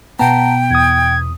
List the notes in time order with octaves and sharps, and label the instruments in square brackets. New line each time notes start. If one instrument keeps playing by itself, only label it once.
[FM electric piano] B2 B3 [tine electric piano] F#5 A5 A#5 [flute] G5
[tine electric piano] E2 D#6 [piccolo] G#6